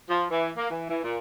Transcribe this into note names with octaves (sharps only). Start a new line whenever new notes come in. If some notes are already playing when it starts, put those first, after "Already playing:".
F3
E3
A#3
E3
E3
A#2